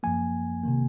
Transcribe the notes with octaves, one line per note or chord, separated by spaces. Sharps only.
F#2 F3 A#3 G#5
C3 D#3 A#3